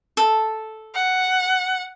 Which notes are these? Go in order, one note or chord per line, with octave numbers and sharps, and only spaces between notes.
A4
F#5